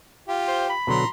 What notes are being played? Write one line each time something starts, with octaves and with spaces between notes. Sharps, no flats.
F4 G4
C5
B5
B2 D3 F#3 A#5 C6